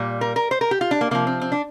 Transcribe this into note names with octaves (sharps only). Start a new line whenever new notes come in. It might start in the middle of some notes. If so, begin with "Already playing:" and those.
Already playing: A#2 G3
A#4
A#4
C5
A#4
G4
F4
D4
A#3
C3 F3 A#3
C4
C4
D4